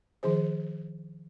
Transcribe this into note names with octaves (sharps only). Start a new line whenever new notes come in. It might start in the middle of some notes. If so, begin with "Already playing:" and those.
D#3 F3 G#4 C5